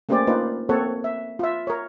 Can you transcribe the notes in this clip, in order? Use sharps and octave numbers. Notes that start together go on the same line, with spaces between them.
A3 A#3 C#4 G4 C5 D5
A#3 D4 D#4 F4 B4 C5
A#3 C4 A4 C#5 F#5
E5
F4 E5
A#4 C#5